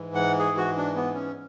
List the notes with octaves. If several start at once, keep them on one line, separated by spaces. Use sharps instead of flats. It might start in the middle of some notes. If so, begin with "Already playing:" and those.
Already playing: G#2 E3
F#5
G#4
F#4
D4
B3
C#4